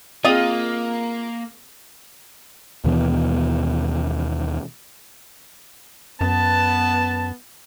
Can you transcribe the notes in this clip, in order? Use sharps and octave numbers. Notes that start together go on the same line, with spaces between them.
A#3 C4 F4 G#4 D#5 D#6
D#2 B2 E3 B3
F#2 B3 A5